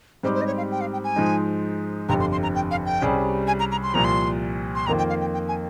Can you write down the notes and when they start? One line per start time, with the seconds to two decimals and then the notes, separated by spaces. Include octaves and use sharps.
0.23 G#2 G3 C4 D#4 G4 C5
0.35 C5
0.41 D#5
0.46 C#5
0.57 F5
0.71 G5
0.81 F5
0.93 G5
1.04 G#5
1.16 G#2 F3 G#3 D#4
2.09 G1 F2 C3 A#5
2.20 C6
2.32 C6
2.43 A#5
2.55 G5
2.71 F5
2.86 G5
3.02 C2 C3 G3 C#4 G#4
3.47 G#5
3.60 A#5
3.72 A#5
3.83 C6
3.94 C2 A#2 F3 A#5
4.04 C6
4.75 C6
4.87 F2 D#3 A#3 F4 A#5
4.98 G5
5.09 F5
5.21 G5
5.34 G5
5.48 G#5